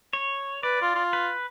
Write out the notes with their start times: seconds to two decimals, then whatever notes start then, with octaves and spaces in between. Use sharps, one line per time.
0.13 C#5
0.63 B4 D5
0.82 F4
0.95 F4
1.13 B4